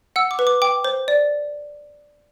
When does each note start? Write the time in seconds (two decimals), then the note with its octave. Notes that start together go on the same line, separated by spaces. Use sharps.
0.16 F#5 E6
0.31 D6
0.39 B4
0.47 D6
0.62 G5 D6
0.85 C5
1.08 D5